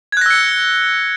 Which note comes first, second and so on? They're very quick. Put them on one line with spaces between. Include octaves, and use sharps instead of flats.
G#6 F#6 A#6 E6 C#7